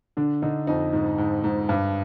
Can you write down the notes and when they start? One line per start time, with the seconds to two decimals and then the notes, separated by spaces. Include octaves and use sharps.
0.17 D3 D4
0.42 D3 D#4
0.67 F2 D#4
0.93 G#2
1.18 G#2
1.44 G#2
1.69 G2